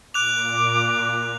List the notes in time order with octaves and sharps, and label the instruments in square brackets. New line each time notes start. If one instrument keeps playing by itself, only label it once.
[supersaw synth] A#2 [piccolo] D6 [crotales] F#6 F7